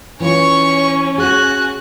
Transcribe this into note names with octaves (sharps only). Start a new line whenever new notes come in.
E3 C#4 F4 C#5 C#6
F#4 G#4 G#5 F#6